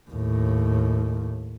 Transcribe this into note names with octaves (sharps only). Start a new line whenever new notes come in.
D#2 A2